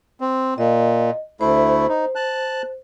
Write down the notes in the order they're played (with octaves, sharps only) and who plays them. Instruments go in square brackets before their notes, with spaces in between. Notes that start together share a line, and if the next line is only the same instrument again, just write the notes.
[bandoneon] C4
[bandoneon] A#2 [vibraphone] D#5
[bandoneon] D2 A3 E4 [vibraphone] C5
[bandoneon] D#4
A5 F#6